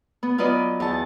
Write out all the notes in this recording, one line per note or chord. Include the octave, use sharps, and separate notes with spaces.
B3
F#3 B3 F4 B4 D5 D#5
E2 A5